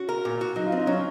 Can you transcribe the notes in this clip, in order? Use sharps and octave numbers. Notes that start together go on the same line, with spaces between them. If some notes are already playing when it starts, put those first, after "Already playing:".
Already playing: C#4 F#4
A#4
A#2
F#4
F#3 D#4
F4
C4 D#4
F#3 C#4